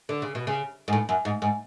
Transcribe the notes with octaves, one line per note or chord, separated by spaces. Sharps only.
D3
C#3
B2
C#3
G#2
A2
F#2
G#2
G#2